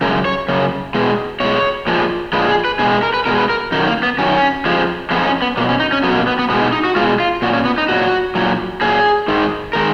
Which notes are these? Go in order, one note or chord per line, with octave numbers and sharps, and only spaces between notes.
F#2 C#3 G#3 A#4
C#5
F#2 C#3
B2 G#3
B2 G#3 C#5
A#2 F3 G#3
A#2 F3 G#3 B4
G#4
B4
B2 G#3 G#4
G#4
A#4
B4
B2 G#3 A#4
B4
A#4
F#2 D#3 F#3 D#4
A#3
B3
F#2 D#3 F#3 C#4
F2 F3 G#3
F2 F3 G#3 B3
D#4
C#4
B3
B2 F#3 A#3
C#4
D#4
C#4
B2 F#3 B3
A#3
B3
B3
B2 G#3 B3
D#4
D#4
F#4
B2 G#3 F4
F4
A#2 F#3 F#4
C#4
B3
D#4
A#2 F#3 F#4
A#2 F#3
A#2 F#3 G#4
G#2 D#3 G#3
D#3 G#3 A#4